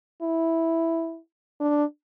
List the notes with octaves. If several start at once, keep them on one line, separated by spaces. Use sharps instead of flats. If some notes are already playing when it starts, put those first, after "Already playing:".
E4
D4